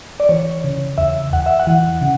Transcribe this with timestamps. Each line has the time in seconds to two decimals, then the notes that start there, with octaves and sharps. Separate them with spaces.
0.20 D5
0.29 E3 C#5
0.64 C#3
0.98 E2 E5
1.33 E2 F#5
1.46 E5
1.59 F#5
1.67 E3
2.01 C#3